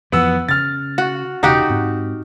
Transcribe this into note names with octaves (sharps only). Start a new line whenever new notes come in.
F2 E3 F3 B3 F#5 E6
C#3 F6 A6
F#4
E1 C#3 D#4 F#4 G4
G#2 C4